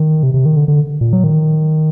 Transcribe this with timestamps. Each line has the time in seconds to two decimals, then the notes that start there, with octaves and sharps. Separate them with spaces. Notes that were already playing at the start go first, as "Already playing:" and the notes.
Already playing: D#3
0.23 C3
0.34 C3
0.46 D#3
0.56 D3
0.68 D3
1.01 A#2
1.13 F#3
1.24 D#3